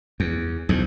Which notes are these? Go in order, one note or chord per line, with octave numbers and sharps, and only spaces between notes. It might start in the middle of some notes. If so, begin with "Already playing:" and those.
E2
B1 E2 G#2